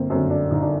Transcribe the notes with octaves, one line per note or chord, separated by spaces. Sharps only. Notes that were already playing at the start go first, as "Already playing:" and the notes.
Already playing: G1 A#3 C4
F#2 D3 C4
D4
G1 D#4
D4